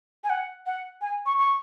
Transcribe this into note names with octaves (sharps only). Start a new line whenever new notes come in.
G#5
F#5
F#5
G#5
C#6
C#6